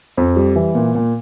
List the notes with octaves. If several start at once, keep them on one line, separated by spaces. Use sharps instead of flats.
F2
G3
E3
A#2
A#2